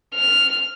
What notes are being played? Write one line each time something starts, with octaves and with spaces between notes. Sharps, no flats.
F6